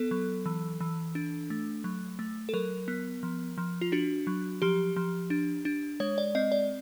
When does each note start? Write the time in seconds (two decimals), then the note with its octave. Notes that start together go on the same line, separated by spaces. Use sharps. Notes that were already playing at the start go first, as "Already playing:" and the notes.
Already playing: B3 A4
0.11 F#3
0.46 E3
0.81 E3
1.15 D4
1.50 A3
1.84 F#3
2.19 A3
2.49 A4
2.53 F#3 A#4
2.88 B3
3.23 F3
3.58 F3
3.81 F4
3.92 D4 F#4
4.27 F#3
4.62 F3 G4
4.96 F3
5.30 D4
5.65 D4
6.00 G#3 C#5
6.18 D5
6.35 C4 D#5
6.52 D5